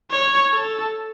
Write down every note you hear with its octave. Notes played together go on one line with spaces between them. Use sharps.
C#5
A4